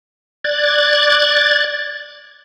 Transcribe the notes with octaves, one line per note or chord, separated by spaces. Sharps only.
D5 F#6 G#6 A6